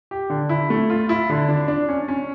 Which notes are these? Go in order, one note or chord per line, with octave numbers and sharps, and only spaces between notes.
G4
D3
E4
A3
F4
E4
D3
D4
D4
C#4
C#4